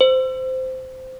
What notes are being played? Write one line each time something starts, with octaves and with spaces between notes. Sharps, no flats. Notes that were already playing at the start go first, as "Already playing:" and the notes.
C5